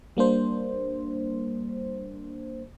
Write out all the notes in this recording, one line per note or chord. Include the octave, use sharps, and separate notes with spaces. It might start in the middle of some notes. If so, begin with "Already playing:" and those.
G3 A#3 D4 C5